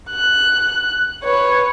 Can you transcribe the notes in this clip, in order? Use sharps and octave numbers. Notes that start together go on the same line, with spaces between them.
F#6
B4 C#5